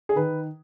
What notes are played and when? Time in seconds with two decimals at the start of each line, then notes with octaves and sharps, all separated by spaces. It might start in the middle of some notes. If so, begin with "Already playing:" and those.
0.09 G#4
0.16 D#3 B4